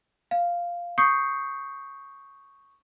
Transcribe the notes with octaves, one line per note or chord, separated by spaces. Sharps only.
F5
C#6 D#6 G6 C7 C#7